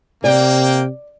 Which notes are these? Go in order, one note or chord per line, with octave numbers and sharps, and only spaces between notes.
C3 A#3 D5 G5